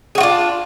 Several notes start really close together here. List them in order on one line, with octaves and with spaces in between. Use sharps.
G#4 F#4 F4 D4